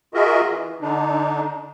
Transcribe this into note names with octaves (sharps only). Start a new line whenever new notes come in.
F4 F#4 G#4 A#4 D#5 E5
E3
D3 D4 D#4